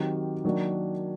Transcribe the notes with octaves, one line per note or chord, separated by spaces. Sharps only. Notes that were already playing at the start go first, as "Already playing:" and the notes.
Already playing: D#3 F#3 C4 G4
D#3 F#3 A#3 D4